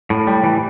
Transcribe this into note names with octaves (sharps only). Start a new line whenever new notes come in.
A2
G3
E3